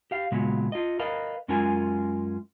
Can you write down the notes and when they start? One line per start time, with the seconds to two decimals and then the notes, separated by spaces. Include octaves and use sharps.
0.11 G4 F5
0.32 A#2 C#3 F#3 G#3 B3
0.72 F4 D#5
0.99 A#4 B4 D#5 F5
1.48 F#2 G#3 C#4 F4 A#4 G#5